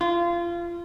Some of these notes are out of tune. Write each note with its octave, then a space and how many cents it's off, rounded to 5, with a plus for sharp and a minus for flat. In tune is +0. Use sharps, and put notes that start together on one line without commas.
F4 -25